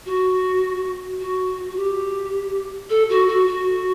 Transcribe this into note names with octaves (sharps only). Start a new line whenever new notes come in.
F#4
F#4
F#4
G4
A4
F#4
F#4
F#4